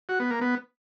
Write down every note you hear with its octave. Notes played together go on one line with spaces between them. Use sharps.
F#4
B3
A#3
B3